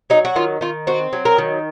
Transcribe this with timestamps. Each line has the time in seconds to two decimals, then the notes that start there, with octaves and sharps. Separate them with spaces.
0.10 F#3 D#4
0.25 F#4
0.36 D#3 F4
0.61 D#3 F4
0.87 C4 F#4
1.13 F#3
1.25 A#4
1.38 D#3